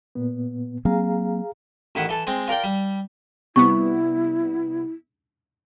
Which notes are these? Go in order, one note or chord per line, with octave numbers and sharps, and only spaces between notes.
A#2 B3
F#3 A#3 C4 G#4 F5 A#5
A1 D#3 E4 F#5
E3 A4 A5
G#3 C4
F4 A#4 D5 G5
G3
C3 G3 B3 E4 C#6